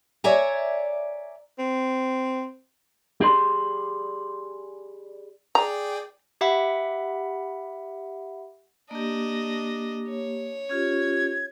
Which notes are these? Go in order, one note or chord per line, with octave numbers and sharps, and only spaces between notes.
C#5 D5 E5 G#5 A#5
C4
G4 G#4 D5 C6
G#4 D5 G5 A#5
G4 E5 F#5 B5
A#3 D4 G4 D#5
C#5
C#4 F4 G4 G#6